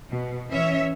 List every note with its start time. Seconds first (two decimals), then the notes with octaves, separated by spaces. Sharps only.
0.11 B2
0.48 E3 C#4 C#5 E5